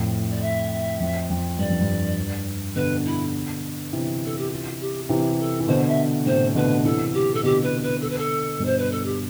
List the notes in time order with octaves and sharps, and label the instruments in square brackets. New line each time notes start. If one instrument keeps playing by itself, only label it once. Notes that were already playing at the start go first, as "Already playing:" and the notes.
Already playing: [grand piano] F2 A2
[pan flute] D5
E5
[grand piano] F2
F2
[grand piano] G2 [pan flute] D5
[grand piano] F2
G2
[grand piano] B2 D3 [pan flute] B4
[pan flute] E4
[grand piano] C3 E3
[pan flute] A4
G4
F4
G4
[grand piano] C3 E3 [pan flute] G4
[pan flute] A4
[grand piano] E3
[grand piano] B2 D3 [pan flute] C5
[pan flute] E5
[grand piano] A2 C3 [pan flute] C5
[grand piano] B2 D3 [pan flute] B4
[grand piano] C3 E3 [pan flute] A4
[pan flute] G4
[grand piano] C3 [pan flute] A4
[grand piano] B2 D3 [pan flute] G4
[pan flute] B4
B4
A4
B4
A4
[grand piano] G2 B2
[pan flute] C5
B4
A4
G4